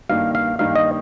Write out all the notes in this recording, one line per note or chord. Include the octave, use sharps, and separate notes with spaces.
G2 D#3 A#3 D#4 F5
F5
G2 D#3 A#3 D#4 F5
D#5